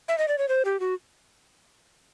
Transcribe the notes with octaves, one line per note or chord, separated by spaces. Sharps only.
E5
D#5
D5
C#5
C5
G4
F#4